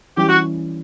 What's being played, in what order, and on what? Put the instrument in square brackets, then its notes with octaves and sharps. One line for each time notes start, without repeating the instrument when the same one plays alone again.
[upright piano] E3 G3 C#4 E4 [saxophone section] G4
[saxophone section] F#4